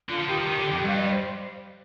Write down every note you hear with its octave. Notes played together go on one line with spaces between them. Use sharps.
D3 F4
F3
D#3 G4
F3
D#3
D3
F2
G2 F5
D#5
D5
C5